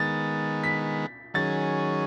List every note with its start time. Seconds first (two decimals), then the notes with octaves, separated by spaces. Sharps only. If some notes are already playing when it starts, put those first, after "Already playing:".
Already playing: D#3 G#3 B3 A6
0.64 B6
1.34 D#3 F#3 C#4 G#4 A6